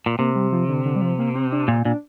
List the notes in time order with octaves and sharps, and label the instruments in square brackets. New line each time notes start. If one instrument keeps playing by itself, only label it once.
[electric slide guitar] A#2
[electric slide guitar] C3 [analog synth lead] A#3
[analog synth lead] G3
F3
D3
D3
G3
F3
A#3
C4
D4
[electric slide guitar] A#2 [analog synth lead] F4
[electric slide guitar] A#2 [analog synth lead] D4